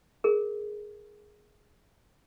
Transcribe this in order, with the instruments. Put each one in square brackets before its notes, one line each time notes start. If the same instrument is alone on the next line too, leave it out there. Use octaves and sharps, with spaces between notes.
[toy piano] G#4 A#4